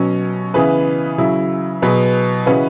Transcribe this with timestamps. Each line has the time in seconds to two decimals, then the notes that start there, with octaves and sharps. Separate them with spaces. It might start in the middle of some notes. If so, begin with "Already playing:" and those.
Already playing: B2 F#3 C#4
0.54 C#3 E3 B3 G#4 B4
1.18 C#3 F#3 E4
1.82 B2 F#3 B3 G#4 B4
2.46 C#3 E3 C#4 F#4 B4